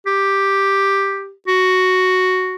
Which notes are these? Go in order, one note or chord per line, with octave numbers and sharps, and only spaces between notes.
G4
F#4